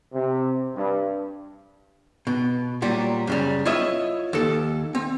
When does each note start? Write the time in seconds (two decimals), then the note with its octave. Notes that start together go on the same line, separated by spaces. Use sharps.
0.13 C3
0.75 G2
2.27 B2
2.82 A#2 F#3 G3
3.27 F#2 C#3 G3
3.65 E4 F4 C#5 D#5 E5
4.33 D#2 A4
4.95 C4